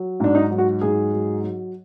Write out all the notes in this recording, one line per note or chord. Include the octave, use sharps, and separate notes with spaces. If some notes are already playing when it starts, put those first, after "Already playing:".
Already playing: F#3
G#2 D4
D#4
F#3
F#4
G#2 G#4
F#3
F#3